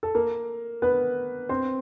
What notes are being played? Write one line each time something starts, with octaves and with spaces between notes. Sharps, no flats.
A4
A#3 A#4
B3 B4
C4 C5